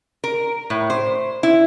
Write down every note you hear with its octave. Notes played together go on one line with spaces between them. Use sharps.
A#4
A2
C5
E4